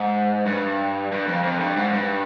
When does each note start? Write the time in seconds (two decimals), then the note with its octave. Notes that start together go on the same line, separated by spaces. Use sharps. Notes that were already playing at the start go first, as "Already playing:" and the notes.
Already playing: G#2
0.46 G2
1.12 G2
1.27 F2
1.43 F2
1.60 G2
1.77 G#2
1.93 G2